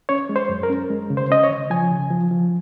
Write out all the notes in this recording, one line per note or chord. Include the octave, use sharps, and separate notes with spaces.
C#4 C#5
G#3
C5
F#2
A#4
C#4
G#3
C#3
C5
C#4 D#5
C#5
C#3
F3 G#5
C#3
F3
F3